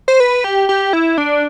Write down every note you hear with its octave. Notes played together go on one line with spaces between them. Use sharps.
C5
B4
G4
G4
E4
D4